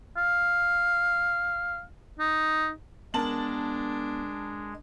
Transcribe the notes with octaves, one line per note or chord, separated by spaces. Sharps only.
F5
D#4
G#3 B3 D4 A#4 A5 F#7